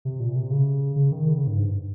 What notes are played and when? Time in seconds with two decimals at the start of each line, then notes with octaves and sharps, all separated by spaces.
0.05 C3
0.20 A#2
0.36 C3
0.51 C#3
0.96 C#3
1.12 D#3
1.27 C#3
1.37 C#3
1.47 G#2
1.57 G2